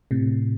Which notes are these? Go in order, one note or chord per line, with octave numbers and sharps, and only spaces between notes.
A2 C3